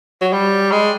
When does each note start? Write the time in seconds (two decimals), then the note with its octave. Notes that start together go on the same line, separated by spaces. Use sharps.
0.21 F#3
0.33 G3
0.72 G#3